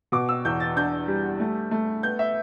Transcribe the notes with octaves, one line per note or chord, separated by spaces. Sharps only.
B2 D6
E6
E2 G6
A6
D4 G6
G3
A3
A3
B3 G6
E5